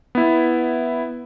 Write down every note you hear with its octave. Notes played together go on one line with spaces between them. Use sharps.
B3 E4